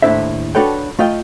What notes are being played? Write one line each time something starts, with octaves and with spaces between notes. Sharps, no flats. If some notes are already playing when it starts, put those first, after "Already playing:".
D#2 A2 D4 E4 C5 E5
D4 F#4 A4 B4 C#5 G5
A3 F4 D#5 G5